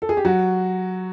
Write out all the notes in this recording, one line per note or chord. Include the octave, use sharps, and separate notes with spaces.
A4
G#4
G4
F#3 F#4